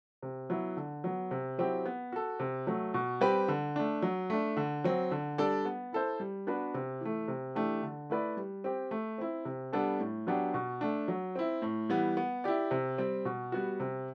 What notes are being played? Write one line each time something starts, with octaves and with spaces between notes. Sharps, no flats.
C3
F#3 B3 E4
D3
F#3 B3
C3
F#3 C4 E4 G4
B3
F#4 A4
C3
F#3 A3
B2
G3 C4 G4 B4
D3
A3 D4
F#3
A3 D4
D3
F#3 C4
D3
G3 D4 A4 D5
B3
E4 A4 C5
G3
B3 D4 F#4 B4
C3
E3 A3
C3
E3 A3 D4 G4
D3
A3 E4 B4 D5
G3
C4 G4
A3
C4 E4
C3
G3 B3 D4 A4
A2
F#3 B3 D4 G4
B2
A3 D4
F#3
C4 E4
A2
E3 G3 B3
B3
E4 G4 D5
C3
G3 C4
B2
G3 B3 F#4
C3